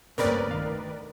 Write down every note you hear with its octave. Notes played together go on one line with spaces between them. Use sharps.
G1 D2 C#3 A#3 C4 A#4 B4 D5
D2 D#3 F5